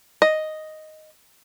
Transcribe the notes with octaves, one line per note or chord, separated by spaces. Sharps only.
D#5